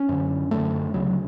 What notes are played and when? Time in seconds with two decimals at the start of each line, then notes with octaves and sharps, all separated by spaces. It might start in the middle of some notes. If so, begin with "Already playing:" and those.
Already playing: C#4
0.09 F#2 D3
0.51 F#2 D3 A3
0.94 D2 C#3 F#3